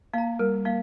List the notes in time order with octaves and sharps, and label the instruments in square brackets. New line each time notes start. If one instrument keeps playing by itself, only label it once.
[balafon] A#3 [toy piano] F5 A#5
[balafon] G3 [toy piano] A#4
[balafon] A#3 [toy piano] F5